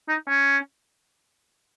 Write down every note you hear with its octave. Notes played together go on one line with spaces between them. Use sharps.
D#4
C#4